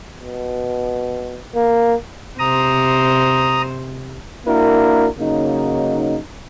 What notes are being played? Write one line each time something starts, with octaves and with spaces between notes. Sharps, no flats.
B2
A#3
C3 C5 A#5 D#6
A#3 D4 E4 F#4 A#4
C#3 F#3 A#3 D#4